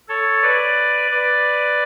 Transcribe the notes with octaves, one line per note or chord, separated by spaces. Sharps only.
A4 C#5
B4 D5
B4 D5